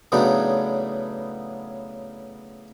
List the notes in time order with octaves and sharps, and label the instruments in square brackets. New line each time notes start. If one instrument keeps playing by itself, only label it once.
[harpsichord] A2 C#3 F#3 B3 D4 D#4